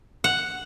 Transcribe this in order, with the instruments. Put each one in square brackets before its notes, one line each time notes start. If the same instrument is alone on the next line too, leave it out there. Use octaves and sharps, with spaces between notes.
[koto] F#5